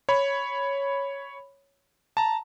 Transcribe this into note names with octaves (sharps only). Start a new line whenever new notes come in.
C#5 B5
A5 A#5